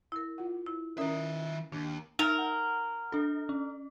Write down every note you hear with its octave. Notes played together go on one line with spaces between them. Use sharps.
E4 A#4
F4 F#5
E4
D#3 C#4 A#4 D5 E5 A#5 D#6
D#2 D4
D#4 A#4
F#5
D4 A4
C#4